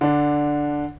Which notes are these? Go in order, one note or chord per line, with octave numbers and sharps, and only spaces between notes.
D3 D4